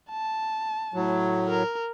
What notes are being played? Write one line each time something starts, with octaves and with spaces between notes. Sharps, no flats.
A5
A2 F#3
A#4